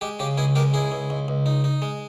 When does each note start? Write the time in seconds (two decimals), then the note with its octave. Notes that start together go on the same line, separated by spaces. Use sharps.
0.01 G#3 G4
0.20 C#3 G4
0.38 C#2 E4 G#4
0.55 G#3 G4 A#4
0.73 C#2 E4 G#4
0.92 C#2
1.10 C#2
1.28 C#2
1.46 D#4
1.64 D#4
1.82 G#3